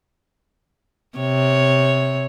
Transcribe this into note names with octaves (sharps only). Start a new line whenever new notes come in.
C3 C#5